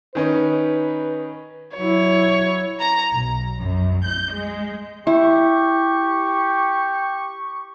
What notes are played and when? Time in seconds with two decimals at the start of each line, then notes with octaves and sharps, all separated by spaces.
0.15 D#3 C#4 D#4 B4
1.77 F#3 E4 C#5
2.80 A#5
3.14 B1
3.58 F#2
4.05 G6
4.33 G#3
5.07 E4 G4 C#6